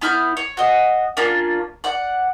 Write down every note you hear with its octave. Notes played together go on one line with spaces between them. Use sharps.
B3 E4 F6 G6
C#5
F#4 D#5
A#3 C#4 D4 F4
D5 F#5